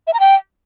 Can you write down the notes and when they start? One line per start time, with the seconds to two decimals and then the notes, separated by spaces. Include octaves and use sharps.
0.07 E5
0.14 A#5
0.20 G5